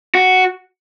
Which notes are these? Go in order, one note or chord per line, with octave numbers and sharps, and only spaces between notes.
F#4